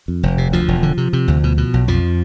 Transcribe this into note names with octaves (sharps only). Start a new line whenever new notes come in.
F2
F1
C3
D2 F3
E1
D3
C3
C3
D2
B2
B2
B1
F2 F3